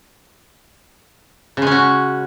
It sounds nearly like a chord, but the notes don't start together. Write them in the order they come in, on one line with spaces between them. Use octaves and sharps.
C#3 G#3 C#4 F#4